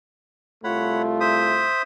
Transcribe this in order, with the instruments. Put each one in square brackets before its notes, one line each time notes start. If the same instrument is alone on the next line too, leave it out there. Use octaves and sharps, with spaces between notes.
[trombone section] C2 A3 F4 [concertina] C#5 F#5 B5
[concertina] C5 E5 D#6